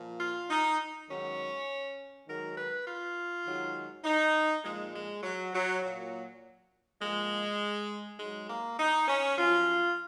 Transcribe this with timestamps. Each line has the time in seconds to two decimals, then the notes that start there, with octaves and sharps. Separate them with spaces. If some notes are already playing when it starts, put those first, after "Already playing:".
Already playing: A#2 F3
0.20 F4
0.49 D#4
1.08 G#2 D#3 F#3 C#4
2.27 G#2 D#3 F#3 A#4
2.57 B4
2.86 F4
3.45 G#2 D#3 F#3
4.04 D#4
4.64 A#2 F3 G#3
4.94 G#3
5.23 F#3
5.53 F#3
5.82 A#2 F#3
7.00 A#2 F3 G#3
8.19 G#2 F#3 G#3
8.48 A#3
8.78 D#4
9.08 C#4
9.37 F#2 F3 F4